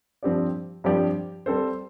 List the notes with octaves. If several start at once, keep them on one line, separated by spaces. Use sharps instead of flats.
G2 F3 C4 G4 D5
G2 F3 C4 G4 D5
G3 C4 A4 C5